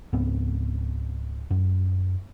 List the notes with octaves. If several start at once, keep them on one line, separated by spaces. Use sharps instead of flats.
C#2 G#2 B3 C4
F#2